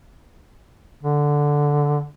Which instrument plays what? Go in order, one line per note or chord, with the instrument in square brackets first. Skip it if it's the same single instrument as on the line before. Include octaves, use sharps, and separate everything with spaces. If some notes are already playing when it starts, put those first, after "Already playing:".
[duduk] D3